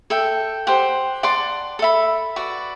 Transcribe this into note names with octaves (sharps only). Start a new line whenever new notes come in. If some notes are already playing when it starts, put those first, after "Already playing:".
A4 E5 G5
G4 C5 F#5
D5 F#5 A5 C6
A4 E5 B5
F#4 B4 D5